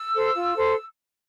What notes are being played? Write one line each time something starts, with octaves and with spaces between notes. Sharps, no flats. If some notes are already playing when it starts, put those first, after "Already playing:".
Already playing: E6
A4 C5
F4
A4 C5